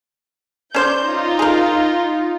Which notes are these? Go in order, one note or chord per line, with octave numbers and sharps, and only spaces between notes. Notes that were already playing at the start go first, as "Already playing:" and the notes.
C#4 C5 D5 G6
D#4 F4
G#4 A#4